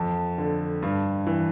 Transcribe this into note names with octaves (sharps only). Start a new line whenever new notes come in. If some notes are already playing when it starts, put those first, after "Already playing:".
Already playing: F2 A5
D3
G2
E3